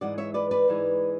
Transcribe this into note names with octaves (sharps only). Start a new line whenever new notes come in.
G#2 E3 G#3 D5 F#5
C#5 E5
B4 D5
B4 D5
G#2 E3 G#3